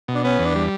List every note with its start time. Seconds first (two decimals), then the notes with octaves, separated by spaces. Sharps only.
0.08 B2
0.14 D4
0.24 B3 C#4
0.39 E2
0.45 D4
0.55 G3